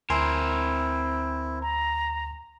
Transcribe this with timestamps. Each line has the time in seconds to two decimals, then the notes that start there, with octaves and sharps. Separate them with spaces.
0.10 D2 C4 E4 A#4 G#5 C6
1.62 A#5